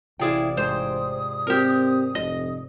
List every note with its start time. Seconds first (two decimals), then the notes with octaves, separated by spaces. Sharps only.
0.19 A1 C3 E4 F4 G#4 D5 G5
0.57 G#2 C5 G5 C6 D#6
1.47 C4 G4 A#4
2.15 F1 D#5